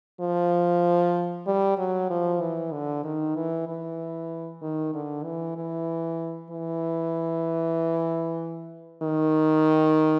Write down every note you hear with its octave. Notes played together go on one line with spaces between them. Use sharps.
F3
G3
F#3
F3
E3
D3
D#3
E3
E3
D#3
D3
E3
E3
E3
D#3